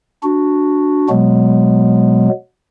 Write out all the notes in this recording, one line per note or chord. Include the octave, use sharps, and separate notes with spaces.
D4 F#4
B2 F#3 G#3 B3